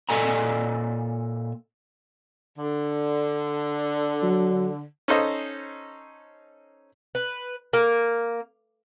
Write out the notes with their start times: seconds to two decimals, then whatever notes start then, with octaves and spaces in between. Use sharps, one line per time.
0.09 A#2 A4 D5 D#5 G#5 A#5
2.57 D3
4.22 F#3
5.08 C#4 D#4 A4 C5 D#5
7.15 B4
7.73 A#3